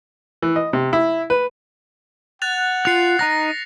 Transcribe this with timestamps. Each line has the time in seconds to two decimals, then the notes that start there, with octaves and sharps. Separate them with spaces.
0.42 E3
0.56 D#5
0.73 C3
0.93 E4
1.30 B4
2.42 F#5 F#6 A6 F7
2.85 F4 F#6 C7 C#7 F7
3.19 D#4 A#5 F#6 A#6